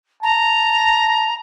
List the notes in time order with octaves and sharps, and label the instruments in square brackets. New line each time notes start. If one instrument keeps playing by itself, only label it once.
[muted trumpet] A5 [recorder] A#5